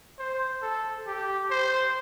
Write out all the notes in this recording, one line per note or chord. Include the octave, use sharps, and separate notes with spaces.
C5
A4
G4
C5